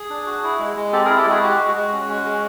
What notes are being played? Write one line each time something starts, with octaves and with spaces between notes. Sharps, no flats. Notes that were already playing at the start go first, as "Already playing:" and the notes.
Already playing: G#4
D4
F#4
E4
G#3
G#3
C4 G4 A4
G#4 A#4
E4
G4 A4
G#3 F#4 G#4
F#4 G4
G#3
F#4
G#3
C#4
F#4
G#3